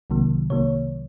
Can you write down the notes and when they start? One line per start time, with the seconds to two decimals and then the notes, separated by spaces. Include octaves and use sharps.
0.10 C2 C3 D#3 F#3 A#3
0.50 C2 C3 D#3 F#3 A#3 C#5